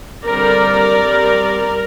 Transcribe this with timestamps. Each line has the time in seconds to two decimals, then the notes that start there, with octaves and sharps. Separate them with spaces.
0.25 D3 G3 C4 A#4 D5
1.00 G3 C4